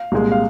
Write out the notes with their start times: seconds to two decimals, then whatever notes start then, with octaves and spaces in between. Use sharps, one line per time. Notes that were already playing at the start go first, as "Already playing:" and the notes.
Already playing: F5
0.12 C2 A#2 G#3
0.32 F5